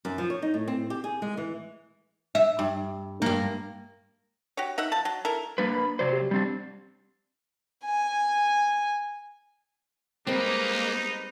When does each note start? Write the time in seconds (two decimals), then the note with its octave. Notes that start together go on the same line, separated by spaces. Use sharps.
0.05 F#2
0.18 F3
0.30 C#5
0.42 D#4
0.54 A2
0.68 C4
0.90 G4
1.04 G#4
1.22 G#3
1.37 E3
2.35 E5
2.59 G2
3.22 G2 A#3
4.57 F#4 G4 C#5
4.78 D#4 E5 F#5
4.92 F3 A5
5.05 F#3
5.25 E4 A4 A#4
5.58 G3 A#3 D4 B4
5.72 B5
5.99 C3 F#3 C5 D5
6.13 G4
6.31 G3 C4 D4
7.85 G#5
10.27 G3 G#3 A#3 C4 D#4 B4